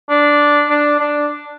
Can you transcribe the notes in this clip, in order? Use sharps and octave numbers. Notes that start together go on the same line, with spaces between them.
D4
D4
D4